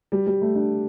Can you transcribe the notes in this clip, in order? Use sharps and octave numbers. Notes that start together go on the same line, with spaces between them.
G3
G3
A3
D4